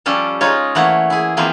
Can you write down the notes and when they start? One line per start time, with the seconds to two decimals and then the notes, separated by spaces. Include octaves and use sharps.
0.06 F3 G3 C#4 G4 A4
0.41 G#3 D#4 F4 C#5
0.75 E3 A3 A#3 C#5 F#5
1.10 E4 G#4
1.37 E3 F3 A#3 C4